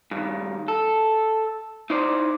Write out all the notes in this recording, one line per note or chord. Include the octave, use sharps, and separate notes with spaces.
G2 D#3
A4
D#4 E4 C5 D5